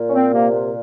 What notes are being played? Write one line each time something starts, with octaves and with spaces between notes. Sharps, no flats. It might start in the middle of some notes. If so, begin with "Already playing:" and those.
Already playing: A#2
C#4
C4
C3 A#3